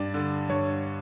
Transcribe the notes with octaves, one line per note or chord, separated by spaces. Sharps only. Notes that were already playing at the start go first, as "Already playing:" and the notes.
Already playing: G2 D5
D3
G2 C#5